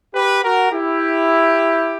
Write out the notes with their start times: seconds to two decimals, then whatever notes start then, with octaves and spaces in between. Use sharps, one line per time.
0.15 G4 B4
0.43 F#4 A#4
0.72 E4 G4